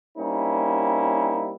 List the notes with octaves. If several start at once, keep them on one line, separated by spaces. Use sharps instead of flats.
G3 A#3 C4 C#4 D#4 E4